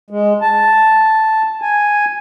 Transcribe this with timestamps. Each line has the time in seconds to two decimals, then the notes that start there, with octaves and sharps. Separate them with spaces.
0.10 G#3
0.42 A5
1.62 G#5